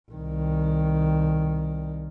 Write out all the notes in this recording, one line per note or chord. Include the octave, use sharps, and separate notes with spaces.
C2 D#3